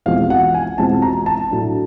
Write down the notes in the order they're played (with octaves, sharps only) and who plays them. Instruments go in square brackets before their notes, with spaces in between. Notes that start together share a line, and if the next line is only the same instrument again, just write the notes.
[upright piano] E2 B2 G#3 C4 F4 [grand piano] F5
[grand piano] F#5
G#5
[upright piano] E2 B2 G#3 C4 F4 [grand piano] A5
[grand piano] A#5
A5
[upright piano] A2 F#3 A3 D4